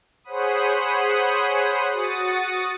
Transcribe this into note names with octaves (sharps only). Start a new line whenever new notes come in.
G#4 C5 C#5 F#5 B5 D#6
F#4 D#6 A6 C#7